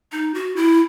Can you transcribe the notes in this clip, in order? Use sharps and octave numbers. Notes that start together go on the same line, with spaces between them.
D#4
F#4
E4